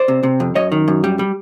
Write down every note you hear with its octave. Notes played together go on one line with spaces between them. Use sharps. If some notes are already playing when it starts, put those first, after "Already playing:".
Already playing: C5 D5
C3
C3
F2
F#2 C#5 D#5
D#3
F#2
G3
G3